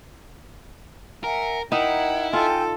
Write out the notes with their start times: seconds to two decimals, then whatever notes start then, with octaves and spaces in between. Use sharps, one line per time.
1.24 A#4 E5 F#5 G#5
1.72 D#4 E4 A#4 F#5 G5
2.33 F4 A4 D#5 G5 G#5